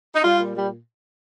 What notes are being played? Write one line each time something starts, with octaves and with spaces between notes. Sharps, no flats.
D#4
G3 F4
A#2
G3